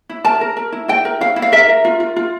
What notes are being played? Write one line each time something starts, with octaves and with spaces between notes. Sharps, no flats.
E4
A#4 A5
A#4
A#4
E4
E4 G5
A#4
E4 F5
E4
F5
A#4 E5
A#4
F4
F4
F4